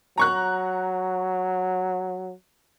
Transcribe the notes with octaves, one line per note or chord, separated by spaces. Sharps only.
F#3 A#5 C#6 F#6